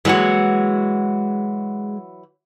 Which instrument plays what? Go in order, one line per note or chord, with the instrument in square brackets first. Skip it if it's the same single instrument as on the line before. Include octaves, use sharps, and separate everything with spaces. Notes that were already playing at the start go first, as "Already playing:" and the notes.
[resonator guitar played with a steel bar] E3 F#3 F#4 [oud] G#3 A#3